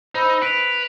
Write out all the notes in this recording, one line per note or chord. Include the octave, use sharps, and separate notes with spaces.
D#4 C5 B5 E6
B4 D7 F7